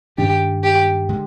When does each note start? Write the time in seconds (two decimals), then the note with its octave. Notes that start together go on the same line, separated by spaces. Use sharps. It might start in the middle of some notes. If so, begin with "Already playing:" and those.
0.18 G2 D#3 G#3 D4 G4
0.63 G4
1.09 D3 G#3